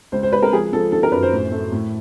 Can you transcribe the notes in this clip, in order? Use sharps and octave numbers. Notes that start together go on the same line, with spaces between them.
C#2 C5
C5
C#2 B4
A#4
F3 G#4
F3 A4
D#3 A4
A#4
F#2 B4
C5
A2
A3
A2